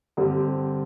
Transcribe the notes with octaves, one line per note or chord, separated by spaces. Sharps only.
G2 D3 G3 C4 G4